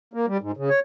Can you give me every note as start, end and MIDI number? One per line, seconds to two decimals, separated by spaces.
0.13 0.26 58
0.27 0.37 55
0.41 0.52 44
0.57 0.70 49
0.70 0.80 73